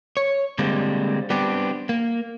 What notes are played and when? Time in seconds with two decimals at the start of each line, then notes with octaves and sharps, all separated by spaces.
0.17 C#5
0.59 D3 G3 G#3 A#3 C4 D4
1.30 G3 B3 C4 D4 G4
1.89 A#3